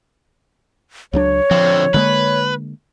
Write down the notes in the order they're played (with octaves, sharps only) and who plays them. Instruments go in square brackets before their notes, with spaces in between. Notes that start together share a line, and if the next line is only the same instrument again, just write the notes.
[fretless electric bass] C#2 F#3 D4 [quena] C#5
[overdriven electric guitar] D3 C4 [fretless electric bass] F3
[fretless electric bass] D3 G#3 A#3 [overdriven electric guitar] B4